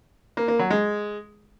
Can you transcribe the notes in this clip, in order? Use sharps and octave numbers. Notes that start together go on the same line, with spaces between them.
A#3
A#3
F#3
G#3